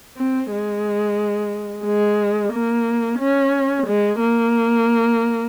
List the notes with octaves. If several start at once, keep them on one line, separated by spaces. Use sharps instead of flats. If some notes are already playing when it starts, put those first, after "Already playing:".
C4
G#3
G#3
A#3
C#4
G#3
A#3